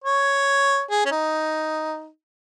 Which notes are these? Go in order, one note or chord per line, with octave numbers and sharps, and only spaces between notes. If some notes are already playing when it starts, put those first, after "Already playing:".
C#5
G#4
C#4
D#4